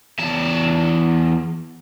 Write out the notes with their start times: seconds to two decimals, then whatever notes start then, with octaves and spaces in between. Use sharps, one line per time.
0.19 E2 A5